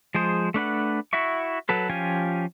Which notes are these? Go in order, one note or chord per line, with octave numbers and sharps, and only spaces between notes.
F3 G#3 G#4 C5
A3 D4 B4 F#5
E4 F#4 E5 C#6
F#3 A4 B4
F3 C#4 F4 G4 G#5